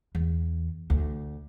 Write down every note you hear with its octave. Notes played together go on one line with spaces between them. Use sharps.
E2
D2